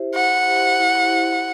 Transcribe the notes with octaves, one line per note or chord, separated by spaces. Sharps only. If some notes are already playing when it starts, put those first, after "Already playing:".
Already playing: E4 G4 C5 E5
E4 F#5
G4 C5 E5
E4